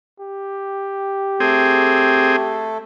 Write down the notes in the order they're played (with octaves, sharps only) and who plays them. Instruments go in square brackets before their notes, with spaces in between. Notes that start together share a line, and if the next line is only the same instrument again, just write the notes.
[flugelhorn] G4
[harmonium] A3 A4 [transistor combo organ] C4 G#4